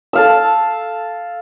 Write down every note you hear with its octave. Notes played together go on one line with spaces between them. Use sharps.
A4 F5 E6